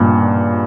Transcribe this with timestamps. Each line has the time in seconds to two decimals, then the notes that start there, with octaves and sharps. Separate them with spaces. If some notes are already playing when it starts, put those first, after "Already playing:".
Already playing: G2 A#2 C#3